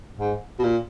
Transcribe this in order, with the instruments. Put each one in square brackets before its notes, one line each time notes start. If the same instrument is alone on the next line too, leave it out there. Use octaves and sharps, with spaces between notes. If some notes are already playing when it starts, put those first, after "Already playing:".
[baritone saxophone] G#2
B2
A#2